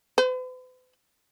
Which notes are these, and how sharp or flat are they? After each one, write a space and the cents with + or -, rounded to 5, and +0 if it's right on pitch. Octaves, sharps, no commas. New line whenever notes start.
B4 +45